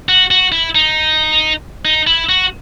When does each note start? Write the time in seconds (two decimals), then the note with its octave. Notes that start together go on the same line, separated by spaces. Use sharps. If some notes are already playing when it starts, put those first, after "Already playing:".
0.09 F#4
0.31 F#4
0.52 E4
0.75 D#4
1.85 D#4
2.07 E4
2.29 F#4